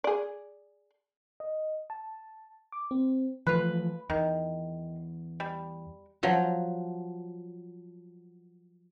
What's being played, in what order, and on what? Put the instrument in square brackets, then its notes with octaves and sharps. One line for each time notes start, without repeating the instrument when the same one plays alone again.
[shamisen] G#4 D5
[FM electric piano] D#5
A5
D6
C4
[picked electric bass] E3 F3 A3 [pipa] F4 B4
[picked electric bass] E2 [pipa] D#3
[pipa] G3
[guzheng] F3 F#3